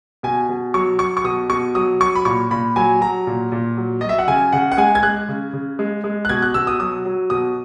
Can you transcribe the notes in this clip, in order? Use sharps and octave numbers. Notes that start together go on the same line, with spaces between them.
B2 G#5
B2
F#3 C#6
F#3 C#6
C#6
B2 D#6
B2 C#6
F#3 D#6
F#3 C#6
B5
A#2 C#6
A#2 B5
F#3 G#5
F#3 A#5
A#2
A#2
F#3
F#3 D#5
E5
F#5
C#3 G#5
C#3 F#5
F#5
G#3 G#5
G#6
G#3 F#6
C#3
C#3
G#3
G#3
F#6
B2 G#6
F#6
B2 E6
D#6
F#3 D#6
F#3
B2 D#6